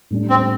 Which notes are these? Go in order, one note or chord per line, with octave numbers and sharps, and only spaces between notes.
A2 G3 D4
C4